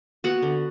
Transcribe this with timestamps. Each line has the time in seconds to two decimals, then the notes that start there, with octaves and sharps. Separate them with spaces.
0.24 B3 F#4 F#5
0.42 D3